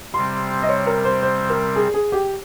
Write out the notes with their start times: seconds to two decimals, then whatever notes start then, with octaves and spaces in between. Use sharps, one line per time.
0.14 C3 G3 C4 C6
0.62 D#5
0.69 C#5
0.87 A#4
1.05 C5
1.22 C5
1.49 A#4
1.76 G#4
1.94 G#4
2.12 G4